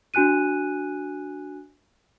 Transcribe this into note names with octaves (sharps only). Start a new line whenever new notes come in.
D4 F#4 G#5 F#6 D#7